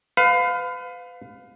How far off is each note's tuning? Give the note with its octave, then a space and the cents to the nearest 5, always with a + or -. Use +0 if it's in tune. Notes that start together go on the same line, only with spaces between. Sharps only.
B4 +35 F5 +20